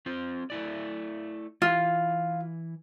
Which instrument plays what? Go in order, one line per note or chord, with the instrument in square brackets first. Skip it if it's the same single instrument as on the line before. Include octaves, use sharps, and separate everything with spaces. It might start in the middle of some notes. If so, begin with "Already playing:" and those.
[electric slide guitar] C4 F4 C5
A3 E4 D5
[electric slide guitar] E3 E4 [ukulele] F4